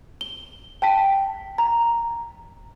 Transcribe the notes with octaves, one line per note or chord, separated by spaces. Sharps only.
G7
G5 A5 B6
A#5